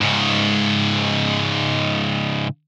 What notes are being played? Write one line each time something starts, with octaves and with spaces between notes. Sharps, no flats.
G#2 C#3